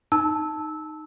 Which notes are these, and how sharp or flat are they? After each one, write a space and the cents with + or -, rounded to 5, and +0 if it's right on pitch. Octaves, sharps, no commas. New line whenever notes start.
D#4 -5 A5 +0 E6 -15